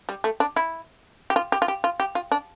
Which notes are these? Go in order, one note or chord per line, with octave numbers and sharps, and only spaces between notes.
G3
A3
D4
E4
G4
F4
G4
F4
G4
F4
G4
F4
D4